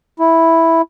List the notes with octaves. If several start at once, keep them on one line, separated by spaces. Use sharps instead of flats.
E4